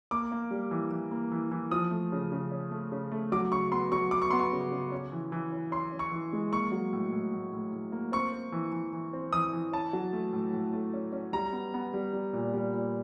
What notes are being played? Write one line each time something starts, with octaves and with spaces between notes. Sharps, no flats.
A#3 D6
A#3
G3
E3
E3
A#3
E3
E3
F3 D#6
A3
C#3
C#3
C#4
A3
C#3
A3
F#3 D6
C#3 C#6
B3 C6
F#3 C#6
B3 D6
C#6
B3 C6
C#6
C#3
C#3
C#4
E3
E3
C#4
C#4 C6
C#4
C#6
E3
G#3
A#3 C#6
F#3
A2
A2
A2
A2
A2
A#3
C4 C#6
C4
E3
E3
E3
C4
E3 D#6
E3
C#4 A5
F#3
A3
A2
A2
A3
C#4
C#4
G3 A#5
B3
B3
G3
G3
A#2
G3
A#2